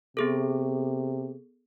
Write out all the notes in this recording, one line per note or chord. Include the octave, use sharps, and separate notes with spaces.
C3 B3 G#4 A4